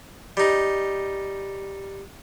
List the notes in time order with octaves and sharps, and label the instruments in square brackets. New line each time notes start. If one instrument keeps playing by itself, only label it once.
[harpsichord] G3 D#4